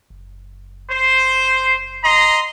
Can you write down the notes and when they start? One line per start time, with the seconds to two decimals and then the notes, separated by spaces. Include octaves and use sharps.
0.10 F#1
0.90 C5
2.04 D#5 A#5 C6